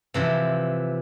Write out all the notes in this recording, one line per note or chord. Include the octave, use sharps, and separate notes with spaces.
C3 E3 F3